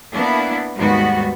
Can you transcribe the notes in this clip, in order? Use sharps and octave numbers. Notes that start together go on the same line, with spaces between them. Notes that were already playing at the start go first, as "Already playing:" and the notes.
A#3 B3 D4 E4
D#2 G#2 G3 B3 F#4